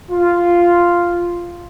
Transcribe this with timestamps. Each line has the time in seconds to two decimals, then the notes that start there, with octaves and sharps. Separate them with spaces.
0.11 F4